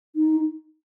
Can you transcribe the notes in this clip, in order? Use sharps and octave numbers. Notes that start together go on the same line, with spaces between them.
D#4